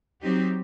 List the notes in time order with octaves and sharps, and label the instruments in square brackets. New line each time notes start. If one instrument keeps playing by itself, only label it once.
[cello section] F#3 C4 D#4 G4